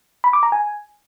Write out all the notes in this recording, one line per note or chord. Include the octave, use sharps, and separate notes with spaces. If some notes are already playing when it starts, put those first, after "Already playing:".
B5
D6
A#5
G#5